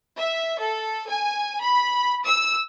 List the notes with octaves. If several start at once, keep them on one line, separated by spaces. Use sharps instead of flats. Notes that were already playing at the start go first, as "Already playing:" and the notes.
E5
A4
G#5
B5
E6